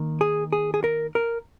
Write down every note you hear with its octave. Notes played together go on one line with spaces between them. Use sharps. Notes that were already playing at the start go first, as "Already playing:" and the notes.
Already playing: D#3 A#3
G#4
G#4
G#4
A#4
A#4